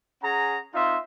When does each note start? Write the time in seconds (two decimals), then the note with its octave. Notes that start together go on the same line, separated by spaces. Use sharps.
0.22 C#4 G#4 F#5 A#5
0.74 C4 D#4 F4 E5 C6